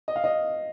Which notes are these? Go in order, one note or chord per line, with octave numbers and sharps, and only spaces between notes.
D#5
F5
D#5